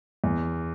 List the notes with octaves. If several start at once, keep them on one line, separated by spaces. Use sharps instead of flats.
E2